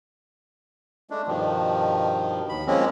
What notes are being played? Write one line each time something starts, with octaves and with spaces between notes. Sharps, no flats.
G#3 A3 D4
G2 B2 D#3 F3
D#2 B5
F3 G#3 A#3 C4 C#4